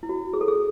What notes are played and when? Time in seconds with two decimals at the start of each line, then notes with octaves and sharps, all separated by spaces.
0.03 E4
0.09 F#4
0.33 G#4
0.41 A4
0.48 G#4